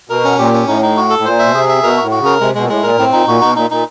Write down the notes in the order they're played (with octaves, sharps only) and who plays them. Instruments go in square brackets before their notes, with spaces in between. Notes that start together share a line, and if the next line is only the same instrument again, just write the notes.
[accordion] B2 [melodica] A#4
[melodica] C#4
[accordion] A#2 [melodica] G4
[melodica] C#4
[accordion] A2 [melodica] D#4
[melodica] D#4
F#4
A4
[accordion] A2
[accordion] A#2 [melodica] C5
[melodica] E5
[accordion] B2
[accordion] C3 [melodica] G#4
[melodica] E5
[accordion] B2 [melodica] A#4
[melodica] F#4
[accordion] A2
[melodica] F#4
[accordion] C#3
[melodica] A#4
[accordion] C3 [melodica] G#3
[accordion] B2 [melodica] G#3
[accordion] A#2
[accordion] A2 [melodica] G#3
[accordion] A#2 [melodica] A#4
[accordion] A2 [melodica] C4
[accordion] A#2 [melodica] D#4
[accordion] A#2 [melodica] F#4
[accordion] B2 [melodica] D#4
[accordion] A#2 [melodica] D#4
[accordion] A#2 [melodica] D#4